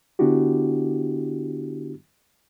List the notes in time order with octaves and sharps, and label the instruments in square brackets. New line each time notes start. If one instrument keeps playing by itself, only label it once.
[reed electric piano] D3 B3 D4 E4 F#4 G4